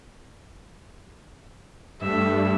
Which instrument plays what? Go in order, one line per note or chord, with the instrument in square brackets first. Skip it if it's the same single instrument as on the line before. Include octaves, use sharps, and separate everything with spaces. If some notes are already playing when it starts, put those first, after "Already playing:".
[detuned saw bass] G2 [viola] A3 E5